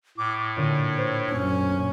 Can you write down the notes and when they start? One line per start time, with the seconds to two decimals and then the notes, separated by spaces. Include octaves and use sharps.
0.18 A2 D6
0.57 A#2 D3 C#5 D#7
0.97 C5
1.32 F#2 C#4